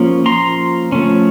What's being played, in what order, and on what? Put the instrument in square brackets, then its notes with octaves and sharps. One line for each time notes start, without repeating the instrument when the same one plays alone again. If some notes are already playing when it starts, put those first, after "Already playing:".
Already playing: [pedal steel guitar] F3 A#3 C#4
A#5 C6
F3 A3 C#4